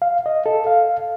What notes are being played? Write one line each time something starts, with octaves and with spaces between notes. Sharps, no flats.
F5
D#5
A4
F5